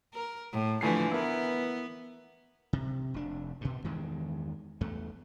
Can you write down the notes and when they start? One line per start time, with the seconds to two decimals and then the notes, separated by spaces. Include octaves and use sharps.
0.13 A#4
0.53 A2
0.81 D3 E3 F3 A3 G#5 C7
1.11 B3 E4 A#4
2.73 C3
3.14 F1 D4
3.61 G2 B2
3.84 E2 G2 D#3 G#3
4.81 E2 A3